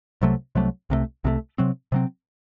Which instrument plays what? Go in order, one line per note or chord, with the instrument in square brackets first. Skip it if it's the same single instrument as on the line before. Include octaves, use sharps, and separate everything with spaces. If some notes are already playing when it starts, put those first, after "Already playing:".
[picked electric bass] C2 C3 F#3 A3
C2 C3 F#3 A3
C2 C3 F#3 A3
C2 C3 F#3 A3
C3 F#3 C4
C3 F#3 C4